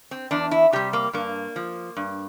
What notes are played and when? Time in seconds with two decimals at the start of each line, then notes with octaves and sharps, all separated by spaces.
0.11 C4
0.31 E2 D4
0.51 E4
0.73 C3 G3 G4
0.93 A#3
1.13 G2 A#3
1.56 F3
1.97 G2